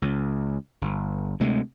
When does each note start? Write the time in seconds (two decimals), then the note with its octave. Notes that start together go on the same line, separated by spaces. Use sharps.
0.02 C#2
0.81 G1
1.40 D2 C3 G#3 A3